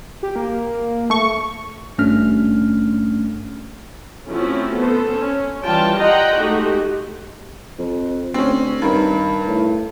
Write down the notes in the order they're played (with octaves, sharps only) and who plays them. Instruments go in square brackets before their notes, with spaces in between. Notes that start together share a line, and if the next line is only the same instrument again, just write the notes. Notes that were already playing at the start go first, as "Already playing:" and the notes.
[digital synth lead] G4
A#3
[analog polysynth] A3 C#6
[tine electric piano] G#1 G2 A3 C#4 D4 F6
[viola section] F3 A3 C4 C#4 E4 F#4
B3 A4 C5
C#4
E3 G3 F4 G5 A5
D#5 F#5 G5 A#5 C6
G#3 A3 D#4 F#4 G4
[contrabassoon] F2
[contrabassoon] D2 [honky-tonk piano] C4 C#4
[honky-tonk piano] G2 A#4 [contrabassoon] D#3
[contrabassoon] A2